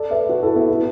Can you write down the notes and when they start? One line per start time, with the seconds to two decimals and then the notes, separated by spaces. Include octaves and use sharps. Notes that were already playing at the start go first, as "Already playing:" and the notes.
Already playing: A4 D5
0.11 B4 E5
0.29 F#4 B4
0.42 E4 A4
0.56 B3 E4
0.69 B3 E4